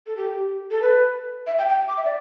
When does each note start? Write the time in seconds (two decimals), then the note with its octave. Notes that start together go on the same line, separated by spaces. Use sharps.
0.07 A4
0.17 G4
0.71 A4
0.82 B4
1.47 E5
1.58 G5
1.69 G5
1.88 D6
1.97 E5
2.05 D5